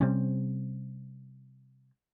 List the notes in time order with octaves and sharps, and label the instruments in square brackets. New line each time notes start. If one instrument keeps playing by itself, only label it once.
[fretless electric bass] C3 G3 C4 C#4